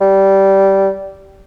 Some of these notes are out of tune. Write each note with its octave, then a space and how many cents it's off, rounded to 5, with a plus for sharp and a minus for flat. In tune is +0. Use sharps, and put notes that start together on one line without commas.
G3 -15